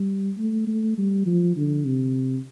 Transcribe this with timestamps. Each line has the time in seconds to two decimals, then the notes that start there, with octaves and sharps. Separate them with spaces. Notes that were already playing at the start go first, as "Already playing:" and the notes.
Already playing: G3
0.38 A3
0.67 A3
0.98 G3
1.26 F3
1.57 D3
1.85 C3